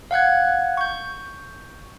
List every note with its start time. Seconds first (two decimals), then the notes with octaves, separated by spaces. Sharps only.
0.11 F5 F#5 F#6 G#6
0.77 C#6 G6